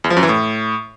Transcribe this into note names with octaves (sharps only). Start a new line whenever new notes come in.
E2
F3
F#2
E3
A2